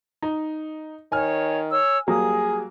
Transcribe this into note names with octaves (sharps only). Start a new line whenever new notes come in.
D#4
D#3 C#5 G#5 F6
C#5 E6
F#3 G3 A#3 G#4 D#6